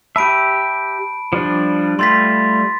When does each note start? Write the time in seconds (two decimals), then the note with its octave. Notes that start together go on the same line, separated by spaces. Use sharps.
0.16 G4 E5 A5 B5 D7
1.33 F3 G3 D4
1.99 G3 A3 F4 C6 A6 B6